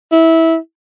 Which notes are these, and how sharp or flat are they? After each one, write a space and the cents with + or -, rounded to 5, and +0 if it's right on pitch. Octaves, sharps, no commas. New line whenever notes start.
E4 -15